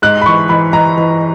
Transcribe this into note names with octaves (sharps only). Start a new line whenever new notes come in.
G#2 F#6
B5
E3 C#6
E3 B5
E3 A#5
E3